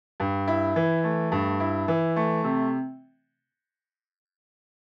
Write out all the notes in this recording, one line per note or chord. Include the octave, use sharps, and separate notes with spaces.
G2
E4
E3
A3
G2
E4
E3
A3
C3